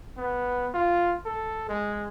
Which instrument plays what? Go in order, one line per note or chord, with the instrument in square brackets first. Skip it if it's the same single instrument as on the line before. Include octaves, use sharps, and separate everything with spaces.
[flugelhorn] B3
F4
A4
G#3